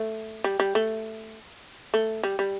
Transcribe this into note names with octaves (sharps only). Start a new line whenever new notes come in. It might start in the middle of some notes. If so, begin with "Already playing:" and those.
Already playing: A3
G3
G3
A3
A3
G3
G3